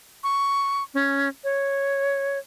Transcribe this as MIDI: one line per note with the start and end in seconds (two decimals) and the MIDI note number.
0.24 0.83 85
0.94 1.28 61
1.44 2.38 73